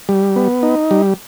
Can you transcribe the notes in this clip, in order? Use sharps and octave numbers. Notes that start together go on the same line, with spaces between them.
G3
B3
D#4
G3